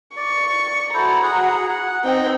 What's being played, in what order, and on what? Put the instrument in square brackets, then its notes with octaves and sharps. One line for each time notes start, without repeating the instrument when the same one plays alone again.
[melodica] D5 [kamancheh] C#6
[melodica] D5
[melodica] E4 A4 C5 [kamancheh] F#4 A#5
[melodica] G#4 F#5
F#5
[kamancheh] C4 G5 [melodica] D#4